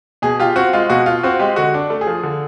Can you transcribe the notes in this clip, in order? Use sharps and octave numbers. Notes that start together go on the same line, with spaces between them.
B2 G#4
F4 G4
C4 F#4
G#3 F4
B2 F#4
F4
C4 F#4
G#3 G4
D3 F#4
D4
A3
G#4
F3
D3